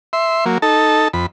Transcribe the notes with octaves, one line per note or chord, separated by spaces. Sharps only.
E5 C6
F#3 A#3
D#4 A4 A5
F2 B5